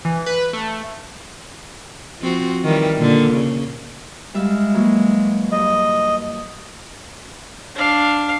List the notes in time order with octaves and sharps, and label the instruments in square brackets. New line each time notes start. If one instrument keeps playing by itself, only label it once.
[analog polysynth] E3
B4
A3
[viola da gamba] F3 C4 F#4
D#3 E3 G3
A#2 D3
C#3
[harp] G3 E5 F5 [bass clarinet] G#3
[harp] E3 F#3 A#3
[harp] G2 [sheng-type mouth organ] D#5
[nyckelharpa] D4 F5